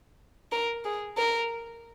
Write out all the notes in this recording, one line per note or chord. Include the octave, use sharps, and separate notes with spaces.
A#4
G#4
A#4